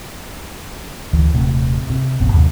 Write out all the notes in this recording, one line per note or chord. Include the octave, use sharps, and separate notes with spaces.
D2 E3
D#1 C3 A3
C3
E1 A1 G2 B3
D#2 C3 F#3